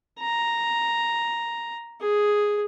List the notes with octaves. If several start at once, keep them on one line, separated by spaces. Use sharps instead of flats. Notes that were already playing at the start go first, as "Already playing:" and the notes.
A#5
G#4